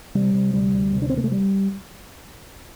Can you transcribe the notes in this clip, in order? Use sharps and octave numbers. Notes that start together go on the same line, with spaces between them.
C3 G3
C3
D2 G3
D2
C3
D4
C4
C3 A#3
A3
G3